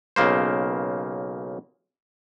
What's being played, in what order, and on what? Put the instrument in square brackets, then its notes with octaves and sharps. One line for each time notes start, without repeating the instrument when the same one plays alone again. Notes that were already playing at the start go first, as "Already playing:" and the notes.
[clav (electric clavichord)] B1 C#3 A#3 C5